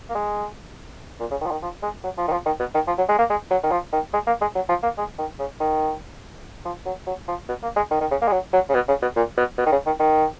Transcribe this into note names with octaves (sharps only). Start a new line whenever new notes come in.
A#3
G#3
A#2
C#3
D#3
F3
D#3
F3
G#3
F#3
F3
D#3
F3
D#3
B2
D#3
F3
F#3
G#3
A#3
G#3
F#3
D#3
F3
D#3
G#3
A#3
G#3
F#3
F3
A#3
G#3
D#3
C#3
D#3
F3
F#3
F#3
F3
B2
A#3
G#3
D#3
D#3
C#3
A#3
G#3
F#3
F#3
C#3
B2
C#3
B2
A#2
B2
B2
D#3
C#3
D#3
D#3